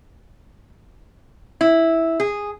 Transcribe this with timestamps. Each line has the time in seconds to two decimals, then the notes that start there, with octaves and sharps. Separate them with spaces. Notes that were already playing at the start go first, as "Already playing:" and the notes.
1.61 E4
2.20 G#4